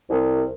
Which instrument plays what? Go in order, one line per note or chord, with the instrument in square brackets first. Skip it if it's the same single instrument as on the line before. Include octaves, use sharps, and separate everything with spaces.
[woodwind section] C2